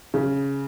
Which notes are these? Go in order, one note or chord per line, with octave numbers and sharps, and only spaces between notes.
C#3